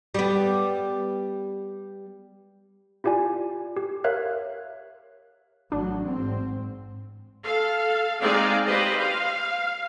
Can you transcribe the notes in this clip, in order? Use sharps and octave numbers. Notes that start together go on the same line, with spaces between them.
G3 B3
E4 F4 G4 D5 G#5
G4
A#4 C#5 E5 F5 F#6 G#6
A1 F#3 D4
G#2 C4
A4 F5
G#3 C4 D#4 G#4 D5 F5
G4 B4 C5 D#5
F5